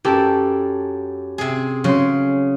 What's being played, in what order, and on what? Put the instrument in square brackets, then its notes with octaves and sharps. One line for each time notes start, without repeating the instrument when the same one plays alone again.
[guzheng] F#2 [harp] G4 A4
[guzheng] C3 G#4
[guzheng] C#3 [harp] F#3 C6